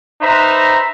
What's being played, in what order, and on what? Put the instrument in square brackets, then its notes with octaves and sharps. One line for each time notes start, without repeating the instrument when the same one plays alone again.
[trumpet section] D#4 B4 C5 E5 A#5